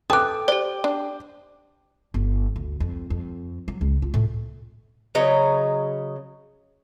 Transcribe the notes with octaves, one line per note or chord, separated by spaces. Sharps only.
A4 B4 G5 D6 D#6 F#6
G4 C5 D5
D4
G1
D2
F2
F2
F#3
C#2
F4
A2
C#3 F#3 C#5 D#5